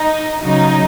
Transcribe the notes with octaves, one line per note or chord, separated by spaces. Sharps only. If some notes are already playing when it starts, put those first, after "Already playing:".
Already playing: D#4
C#3 F#3 D#4